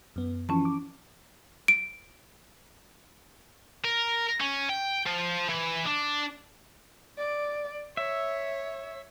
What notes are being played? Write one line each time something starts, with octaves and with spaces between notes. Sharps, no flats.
F#2 B3
E3 F3 C#4 A5
D6
D7
A#4
C#4
G5
F3
E3
D4
D5
C#5 E5